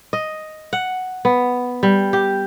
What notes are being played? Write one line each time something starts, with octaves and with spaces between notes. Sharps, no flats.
D#5
F#5
B3
G3
G4